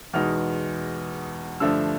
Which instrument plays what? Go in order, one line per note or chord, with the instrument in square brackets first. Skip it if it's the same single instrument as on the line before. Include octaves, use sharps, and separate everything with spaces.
[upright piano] E2 B2 G#3 B3 D#4 F6
G2 D3 F3 A3 D4 E6